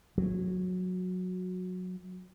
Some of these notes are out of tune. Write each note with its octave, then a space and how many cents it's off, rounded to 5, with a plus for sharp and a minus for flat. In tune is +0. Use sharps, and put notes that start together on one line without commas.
F#3 -15